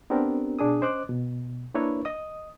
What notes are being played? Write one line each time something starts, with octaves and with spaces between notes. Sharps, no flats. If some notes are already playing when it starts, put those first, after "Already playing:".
B3 C4 D4 G4 A#4
B2 D4 G#4 D#6
C#4 C5 D#5 D6 F#6
B2
A#3 D4 E4 A#4 B4 C#5
D#5 D#6